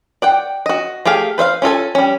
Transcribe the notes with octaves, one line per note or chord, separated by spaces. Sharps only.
D5 F#5 G5
F#4 D#5
A3 G4 G#4 F5
B4 C5 E5 F5
C#4 F4 A4 G#5
G3 C#4